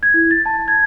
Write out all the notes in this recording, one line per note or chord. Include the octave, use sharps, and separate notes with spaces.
G#6
E4
A6
A5
G#6